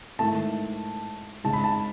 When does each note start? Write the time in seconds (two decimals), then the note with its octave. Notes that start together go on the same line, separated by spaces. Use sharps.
0.19 G#2 D#3 A3 E4 A5
1.44 C#3 G#3 D#4 A5
1.53 B5
1.64 A5